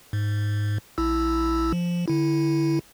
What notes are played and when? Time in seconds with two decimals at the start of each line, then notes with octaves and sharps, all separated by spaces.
0.13 G#2
0.98 A#1 E4 E6
1.72 F3
2.08 D3 E4